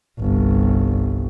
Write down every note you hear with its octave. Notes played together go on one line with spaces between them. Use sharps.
G1 C2